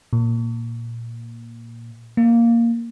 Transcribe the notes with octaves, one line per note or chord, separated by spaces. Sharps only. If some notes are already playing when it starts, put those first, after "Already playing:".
A#2
A#3